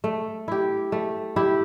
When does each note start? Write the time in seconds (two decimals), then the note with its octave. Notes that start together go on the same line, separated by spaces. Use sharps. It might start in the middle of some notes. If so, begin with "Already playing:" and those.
0.04 A3
0.48 E4 G4
0.92 A3
1.36 E4 G4